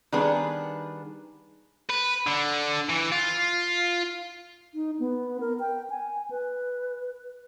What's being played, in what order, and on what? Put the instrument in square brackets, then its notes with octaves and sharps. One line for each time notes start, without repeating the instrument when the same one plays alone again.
[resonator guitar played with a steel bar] D#3 G3 B3 D4 G#4 B4
[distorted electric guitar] B4
D3
E3
F4
[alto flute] D#4
B3
A#4
G5
G#5
B4